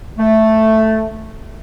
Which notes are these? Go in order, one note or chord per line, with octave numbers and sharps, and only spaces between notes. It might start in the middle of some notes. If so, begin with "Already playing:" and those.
A3